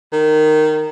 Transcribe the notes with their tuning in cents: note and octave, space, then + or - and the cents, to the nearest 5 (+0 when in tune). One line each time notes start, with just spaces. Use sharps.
D#3 -10